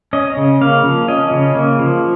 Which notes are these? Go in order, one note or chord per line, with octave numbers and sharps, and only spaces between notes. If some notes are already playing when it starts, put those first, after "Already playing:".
C#4 D#5
C#3
A#3 F5
F3
C#4 D#5
C#3
A#3
F3